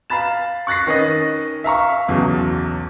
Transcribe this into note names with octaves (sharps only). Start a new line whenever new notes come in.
F5 A#5 B5 A6 E7
C#6 F#6 A6 A#6 C7
D#3 C#4 B4 D#5 A#6
E5 F5 A#5 C#6
B1 E2 C#3 F#3